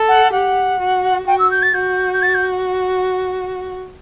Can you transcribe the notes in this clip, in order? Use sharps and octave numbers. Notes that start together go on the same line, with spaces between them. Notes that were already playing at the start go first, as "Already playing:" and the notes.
Already playing: A4
F#5
G4 F#5
F#4
F#4 G5
E6
G6
A6
F#4 G6
G6
A6
G6